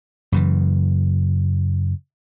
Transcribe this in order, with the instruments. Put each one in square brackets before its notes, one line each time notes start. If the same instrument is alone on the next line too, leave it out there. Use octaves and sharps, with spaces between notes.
[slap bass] F#2 C#3 E3